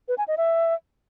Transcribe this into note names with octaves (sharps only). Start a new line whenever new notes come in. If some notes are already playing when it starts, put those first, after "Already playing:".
B4
G#5
D#5
E5